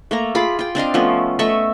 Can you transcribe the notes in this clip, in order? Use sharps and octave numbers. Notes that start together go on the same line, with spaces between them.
A3 A#3 A#5
F4 G#4 B5 D6
F4 G5
C4 D4 D#5 F5
F3 A3 B3 C#4
A3 D#5 E5 C#6